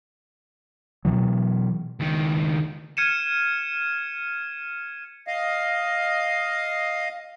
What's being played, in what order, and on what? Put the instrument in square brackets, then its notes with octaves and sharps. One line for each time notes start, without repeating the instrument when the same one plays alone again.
[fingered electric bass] B2 E3 F#3
[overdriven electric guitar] C#2 D#3
[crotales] F6 G#6 C#7 D#7 E7
[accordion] D#5 F5